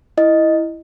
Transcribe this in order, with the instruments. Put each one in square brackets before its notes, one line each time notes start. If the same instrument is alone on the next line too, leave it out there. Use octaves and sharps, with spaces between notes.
[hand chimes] E4 D#5